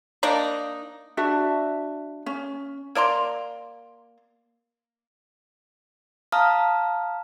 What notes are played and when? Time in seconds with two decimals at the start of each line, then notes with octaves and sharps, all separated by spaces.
0.23 A#3 D4 D#4
1.17 D4 F#4 E5
2.26 C#4
2.95 A#3 D5 A#5 C6
6.32 F5 A5 A#5 D#6 F6